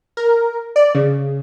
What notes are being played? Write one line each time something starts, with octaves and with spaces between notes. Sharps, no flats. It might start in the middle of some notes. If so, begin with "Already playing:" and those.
A#4
D5
C#3